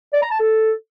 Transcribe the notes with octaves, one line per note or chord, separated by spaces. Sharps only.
D5
A#5
A5
A4